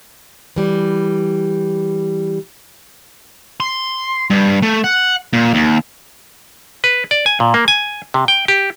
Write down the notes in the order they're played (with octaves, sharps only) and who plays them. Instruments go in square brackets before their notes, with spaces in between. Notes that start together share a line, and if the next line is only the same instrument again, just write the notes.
[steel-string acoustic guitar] E3 G3
[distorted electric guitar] C6
G2
A3
F#5
A#2
D#2
[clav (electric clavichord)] B4
D5
G#5
A#2
A#3
G#5
C3
G5
G4